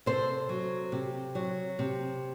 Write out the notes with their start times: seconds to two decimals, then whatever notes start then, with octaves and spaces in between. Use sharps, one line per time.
0.06 C3 A4 C5
0.49 F#3
0.92 C3
1.35 F#3
1.79 C3